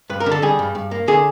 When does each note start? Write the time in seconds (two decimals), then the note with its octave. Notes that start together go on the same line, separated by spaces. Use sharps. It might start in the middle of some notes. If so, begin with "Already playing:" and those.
0.09 G2 B4
0.20 A#4
0.26 D3
0.32 A4
0.42 G3 G#4
0.59 G2
0.75 G2
0.91 A#3
1.08 D3 G#4